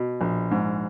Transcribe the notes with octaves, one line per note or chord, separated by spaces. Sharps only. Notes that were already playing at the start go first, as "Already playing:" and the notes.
Already playing: B2
A#1
G#2